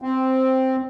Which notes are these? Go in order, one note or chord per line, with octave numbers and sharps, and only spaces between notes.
C4